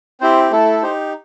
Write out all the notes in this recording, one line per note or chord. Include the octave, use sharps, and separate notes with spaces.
C4 E4 G4 C5
A3 E4 A4
D#4 G4 C5